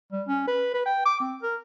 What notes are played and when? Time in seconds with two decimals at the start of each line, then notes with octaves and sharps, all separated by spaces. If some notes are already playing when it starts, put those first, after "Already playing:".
0.12 G3
0.28 C#4
0.48 B4
0.74 B4
0.86 G5
1.05 D6
1.20 C4
1.43 A#4